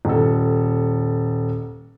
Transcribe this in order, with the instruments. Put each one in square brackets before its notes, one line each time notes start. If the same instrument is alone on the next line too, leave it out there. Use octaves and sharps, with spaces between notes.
[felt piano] D#1 A4